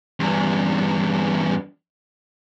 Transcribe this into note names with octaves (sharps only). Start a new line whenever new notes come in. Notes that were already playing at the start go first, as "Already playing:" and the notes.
E2 G2